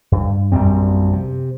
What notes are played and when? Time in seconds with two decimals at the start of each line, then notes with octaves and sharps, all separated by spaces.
0.12 G2
0.52 A#1 F#2 G3 C4
1.13 C3